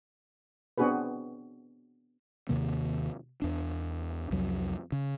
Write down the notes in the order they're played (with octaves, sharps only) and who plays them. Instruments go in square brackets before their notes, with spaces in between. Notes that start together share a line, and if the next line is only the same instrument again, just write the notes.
[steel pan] B3 C4 D4 F#4 G#4 B4
[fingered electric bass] D#2 C3 D#3 A#3
E2 D4
C2 F2 F#3
C#3